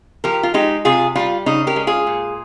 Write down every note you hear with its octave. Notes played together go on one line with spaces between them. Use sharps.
F3 G4 A#4
F4
G#3 D#4 G4
C3 F4 G#4
G3 F4
C#3 D#4
G4 A#4
G#3
F4 G#4
A#2